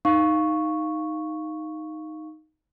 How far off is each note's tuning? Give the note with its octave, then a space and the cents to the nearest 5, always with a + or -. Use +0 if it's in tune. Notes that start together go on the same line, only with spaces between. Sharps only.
D#4 +0 F5 +0 C#6 +0